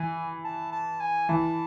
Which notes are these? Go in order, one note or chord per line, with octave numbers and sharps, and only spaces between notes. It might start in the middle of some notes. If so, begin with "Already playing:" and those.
Already playing: E3 G#5
A5
A5
G#5
E3 A5